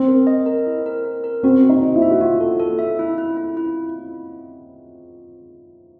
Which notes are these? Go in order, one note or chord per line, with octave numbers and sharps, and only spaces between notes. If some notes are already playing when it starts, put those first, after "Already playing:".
Already playing: C4
A#4
D#5
A#4
E4
A#4
A#4
A#4
C4 F#4
F#4
D#4
C5
E4
E5
F#4
F4 F#4
A4
A4
E5
E4
E4
E4
E4